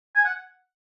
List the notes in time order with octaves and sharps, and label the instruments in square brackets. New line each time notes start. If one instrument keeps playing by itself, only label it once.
[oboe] G#5
F#5